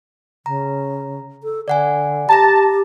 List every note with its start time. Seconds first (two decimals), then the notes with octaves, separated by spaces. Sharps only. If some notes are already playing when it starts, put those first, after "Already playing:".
0.46 C#3 A#5
1.43 A4
1.68 D3 D5 F#5 G#5
2.29 G4 A5 A#5 A6 A#6